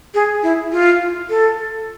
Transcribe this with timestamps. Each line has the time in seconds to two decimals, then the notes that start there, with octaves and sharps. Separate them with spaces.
0.14 G#4
0.43 E4
0.72 F4
1.29 A4